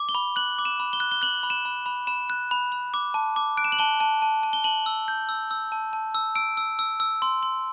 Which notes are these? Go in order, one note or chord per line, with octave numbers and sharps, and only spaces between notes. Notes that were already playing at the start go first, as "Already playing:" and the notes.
Already playing: D6
G7
B5
F#6 F#7
D6
E7
B5
G7
F#6
G7
F#6 F#7
B5
E7
B5
B5
B5 E7
F#6
B5
B5
D6
A5
D6
F#6 D7
E7
F#7
A5 G7
A5
A5
A5
G7
A5 F#7
E6
G6
E6
E6
A5
A5
E6
E6 D7
E6
E6
E6
C6
C6